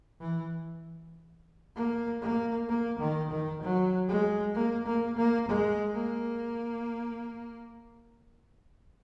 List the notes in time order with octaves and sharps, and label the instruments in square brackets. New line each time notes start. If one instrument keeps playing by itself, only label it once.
[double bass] E3
A#3
A#3
A#3
D#3
D#3
F#3
G#3
A#3
A#3
A#3
G#3
A#3